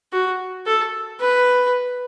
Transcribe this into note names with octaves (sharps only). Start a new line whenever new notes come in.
F#4
A4
B4